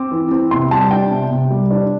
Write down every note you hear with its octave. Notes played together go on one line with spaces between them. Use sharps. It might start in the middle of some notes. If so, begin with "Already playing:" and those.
Already playing: C4 D6
E3
C4
C3 C6
G3 A5
D4 G5
C3
C3
G3
D4